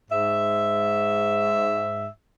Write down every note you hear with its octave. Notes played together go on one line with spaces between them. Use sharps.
G#2 E5